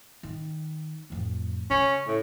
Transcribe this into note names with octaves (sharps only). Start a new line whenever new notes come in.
D#3
A1 F2
C#3 C#4
A2